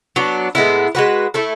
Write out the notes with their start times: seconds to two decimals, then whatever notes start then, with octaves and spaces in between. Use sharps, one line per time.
0.16 F#3 B3 D4
0.55 A2 G#3 B3 E4
0.95 G#3 B3 F#4 B4
1.34 A3 E4 A4